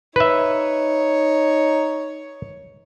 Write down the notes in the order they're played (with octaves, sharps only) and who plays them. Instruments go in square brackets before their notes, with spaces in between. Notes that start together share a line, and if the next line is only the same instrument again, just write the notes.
[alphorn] D#4 [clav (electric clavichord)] B4 E5 [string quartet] C#5